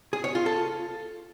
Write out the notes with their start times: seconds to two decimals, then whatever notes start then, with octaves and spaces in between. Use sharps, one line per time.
0.13 G#4
0.24 C#5
0.35 F4
0.46 A4